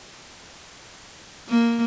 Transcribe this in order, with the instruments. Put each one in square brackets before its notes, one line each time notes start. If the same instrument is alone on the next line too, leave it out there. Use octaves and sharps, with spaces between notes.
[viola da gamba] A#3